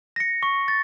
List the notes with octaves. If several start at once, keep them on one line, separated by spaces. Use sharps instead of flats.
A#6 C#7
C#6
A6